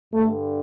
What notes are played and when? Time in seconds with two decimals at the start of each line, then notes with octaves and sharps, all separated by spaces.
0.13 G2 D3 A3